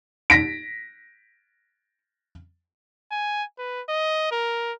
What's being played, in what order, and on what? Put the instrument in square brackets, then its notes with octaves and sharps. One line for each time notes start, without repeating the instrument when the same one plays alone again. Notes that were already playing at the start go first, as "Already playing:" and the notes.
[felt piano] A#6 B6 D7
[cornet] G#5
B4
D#5
A#4